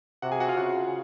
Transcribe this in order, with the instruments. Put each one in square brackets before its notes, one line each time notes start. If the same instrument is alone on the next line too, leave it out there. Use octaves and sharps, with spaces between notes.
[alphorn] C3 [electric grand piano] F#4 F#5
[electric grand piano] G#4 G#5
F#4 F#5
F4 F5
[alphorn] C#3 [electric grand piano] F#4 F#5